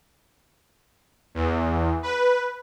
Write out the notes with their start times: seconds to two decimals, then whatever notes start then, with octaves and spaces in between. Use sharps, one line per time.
1.35 E2
2.03 B4